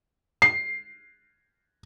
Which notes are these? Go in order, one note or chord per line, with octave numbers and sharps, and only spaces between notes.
C7